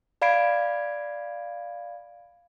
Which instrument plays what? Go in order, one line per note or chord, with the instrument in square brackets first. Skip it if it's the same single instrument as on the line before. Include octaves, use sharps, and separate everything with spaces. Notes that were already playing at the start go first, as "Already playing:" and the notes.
[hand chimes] D5 F5 B5 G#6 C7 D7